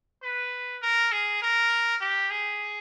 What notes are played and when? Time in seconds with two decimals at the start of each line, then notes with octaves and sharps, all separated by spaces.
0.23 B4
0.82 A#4
1.12 G#4
1.42 A#4
2.01 G4
2.31 G#4